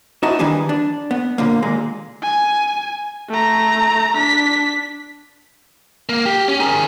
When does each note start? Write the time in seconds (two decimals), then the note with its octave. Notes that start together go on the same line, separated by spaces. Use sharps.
0.23 D#4 E4 F#4 A5
0.39 D#3 E3 G3 D4 G#4
0.69 D4
1.11 B3
1.38 A#2 D3 A#3
1.63 D#2 A#2 G#3
2.22 G#5
3.29 A3 A#5
4.17 D4 B6
6.09 A#3
6.26 G4
6.48 C#4
6.60 G#4 A#4